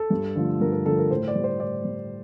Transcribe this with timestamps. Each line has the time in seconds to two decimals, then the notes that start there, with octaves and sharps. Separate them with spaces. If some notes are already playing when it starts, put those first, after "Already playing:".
Already playing: A4
0.10 G2
0.36 D3 F3 A3
0.60 G2 A#4
0.73 A#4
0.86 D3 F3 A3 A4
0.99 A#4
1.10 A2 C5
1.28 D5
1.35 G3
1.44 C5
1.60 A2 D5
1.85 G3